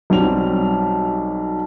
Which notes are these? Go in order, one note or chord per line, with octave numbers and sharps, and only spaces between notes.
B1 F#3 G3 C4 F7